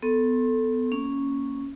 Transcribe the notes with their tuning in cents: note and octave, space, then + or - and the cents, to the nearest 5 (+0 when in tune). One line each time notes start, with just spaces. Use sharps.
B3 +20 A4 +0 C6 +40
A#3 +0 C#4 +0